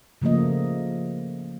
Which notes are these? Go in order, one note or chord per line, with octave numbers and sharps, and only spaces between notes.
C#3 F3 A3 A#3 D#5